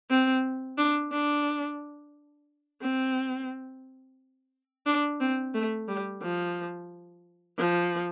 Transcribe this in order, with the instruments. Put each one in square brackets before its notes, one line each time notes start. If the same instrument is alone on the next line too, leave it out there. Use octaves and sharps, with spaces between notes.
[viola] C4
D4
D4
C4
D4
C4
A3
G3
F3
F3